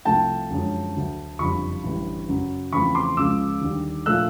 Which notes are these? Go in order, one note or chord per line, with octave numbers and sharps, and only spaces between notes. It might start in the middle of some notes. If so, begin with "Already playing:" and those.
C2 C3 F3 A3 G5 A5
F#2 D3 F3 G#3 C#4
D2 D3 F#3
F#1 F2 D3 G3 B5 C#6
A1 G2 D3 G3
F#2 C#3 F#3
E2 C#3 F3 A3 C4 B5 C#6
C6 D6
C#2 C#3 F3 G#3 D6 E6
D#2 D3 G3
A#2 F3 A3 D4 E6 F#6